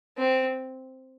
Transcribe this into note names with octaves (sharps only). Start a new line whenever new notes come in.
C4